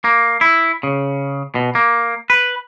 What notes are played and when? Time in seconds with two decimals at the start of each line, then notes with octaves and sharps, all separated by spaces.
0.04 A#3
0.41 E4
0.83 C#3
1.55 B2
1.75 A#3
2.30 B4